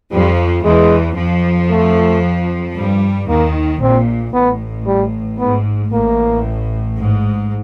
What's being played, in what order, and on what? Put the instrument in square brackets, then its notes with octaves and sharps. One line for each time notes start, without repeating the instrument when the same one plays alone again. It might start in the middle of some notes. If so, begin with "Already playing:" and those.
[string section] F2 F3 [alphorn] G3
[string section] E2 E3 [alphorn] G#3
[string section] F2 F3
[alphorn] A3
[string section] G2 G3
[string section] D#2 D#3 [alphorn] A#3
[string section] A#1 A#2 [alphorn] C4
[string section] A1 A2 [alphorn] B3
[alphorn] G3
[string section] G#2 [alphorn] B3
[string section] A1 A2 [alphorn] A#3
[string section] G#2